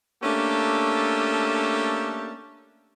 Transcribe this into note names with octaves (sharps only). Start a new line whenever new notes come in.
A3 A#3 C#4 D4 G4 A4